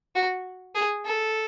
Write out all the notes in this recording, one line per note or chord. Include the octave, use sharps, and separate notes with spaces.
F#4
G#4
A4